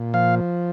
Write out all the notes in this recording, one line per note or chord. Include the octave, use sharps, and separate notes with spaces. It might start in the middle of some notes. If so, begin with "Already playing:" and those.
Already playing: A#2
F3 F5